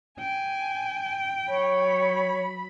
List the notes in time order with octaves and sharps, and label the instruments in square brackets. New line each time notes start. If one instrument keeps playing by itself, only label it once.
[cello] G5 [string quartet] G#5
[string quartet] F#3 B5 [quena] C#5